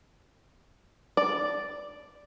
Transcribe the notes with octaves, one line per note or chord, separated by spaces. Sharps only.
D5